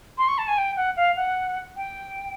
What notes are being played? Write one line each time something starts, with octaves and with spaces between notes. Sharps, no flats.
C6
C#6
A5
G#5
G5
F#5
F5
F#5
G5